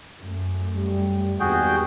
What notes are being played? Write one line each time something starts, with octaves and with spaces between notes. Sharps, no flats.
F#2 A3
G3
G#1 E2 G2 G3 F#4 G#4 G5